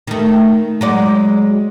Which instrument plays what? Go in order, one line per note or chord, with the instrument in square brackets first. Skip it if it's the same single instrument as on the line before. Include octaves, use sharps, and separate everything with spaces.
[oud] D#3 A3
F#3 G#3 D5